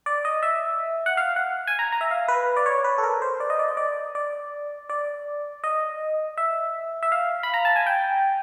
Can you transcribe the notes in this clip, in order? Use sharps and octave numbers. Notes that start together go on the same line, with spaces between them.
D5
D#5
E5
F#5
F5
F#5
G#5
A#5
A#5
E5
F5
B4
D5
C#5
B4
A4
A#4
C5
D5
D#5
D5
D#5
D5
D5
D5
D#5
E5
E5
F5
B5
A#5
A5
G#5
G5